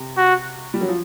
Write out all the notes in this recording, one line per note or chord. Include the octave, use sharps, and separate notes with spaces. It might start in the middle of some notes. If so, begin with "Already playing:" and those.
Already playing: C3
F#4
G3
F#3
F3